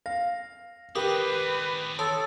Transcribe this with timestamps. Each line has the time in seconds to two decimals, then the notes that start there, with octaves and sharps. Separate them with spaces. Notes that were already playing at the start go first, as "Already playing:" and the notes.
0.06 F5 A#6
0.95 D#3 C4 G4 A#4 B4 D6 D#6
1.99 A4 C#5 A5 C6 D#6